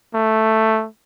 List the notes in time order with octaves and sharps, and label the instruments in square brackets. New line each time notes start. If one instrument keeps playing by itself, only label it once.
[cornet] A3